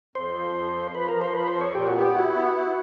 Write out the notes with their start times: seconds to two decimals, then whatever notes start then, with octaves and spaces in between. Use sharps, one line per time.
0.15 F2 C5
0.35 F3
0.55 F2
0.75 F3
0.95 F3 B4
1.08 A#4
1.15 F3
1.21 C5
1.35 F3 B4
1.48 C5
1.55 F2
1.61 C#5
1.75 A#2 G4
1.87 F#4
1.95 B3 G4
2.15 E4 F#4
2.36 B3
2.55 E4